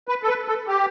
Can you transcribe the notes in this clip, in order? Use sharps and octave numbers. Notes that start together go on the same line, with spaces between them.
B4
A4
B4
A4
G4